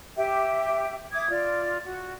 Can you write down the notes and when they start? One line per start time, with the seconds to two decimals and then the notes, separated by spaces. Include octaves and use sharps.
0.16 G4 E5 G5
1.12 E5 D6 D#6 G#6
1.29 F4 D5
1.84 F#4